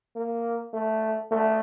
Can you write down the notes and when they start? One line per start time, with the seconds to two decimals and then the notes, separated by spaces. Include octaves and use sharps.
0.16 A#3
0.74 A3
1.31 A3